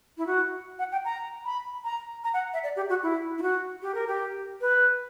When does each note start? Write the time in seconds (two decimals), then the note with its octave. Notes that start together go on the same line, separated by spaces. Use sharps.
0.18 E4
0.27 F#4
0.79 F#5
0.92 G5
1.05 A#5
1.45 B5
1.84 A#5
2.24 A#5
2.34 F#5
2.53 E5
2.63 D5
2.76 G4
2.89 F#4
3.03 E4
3.38 E4
3.42 F#4
3.82 G4
3.95 A#4
4.07 G4
4.61 B4